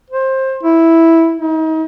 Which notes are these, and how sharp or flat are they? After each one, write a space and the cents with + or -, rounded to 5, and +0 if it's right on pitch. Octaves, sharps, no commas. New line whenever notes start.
C5 +20
E4 -5
D#4 +35